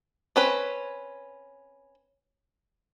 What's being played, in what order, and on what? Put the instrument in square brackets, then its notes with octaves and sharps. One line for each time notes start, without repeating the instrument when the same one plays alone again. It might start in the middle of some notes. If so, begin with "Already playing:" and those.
[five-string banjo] C4 C#4 B4